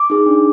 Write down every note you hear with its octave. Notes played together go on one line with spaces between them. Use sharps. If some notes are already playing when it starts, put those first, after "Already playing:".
Already playing: D6
D#4 G#4
D4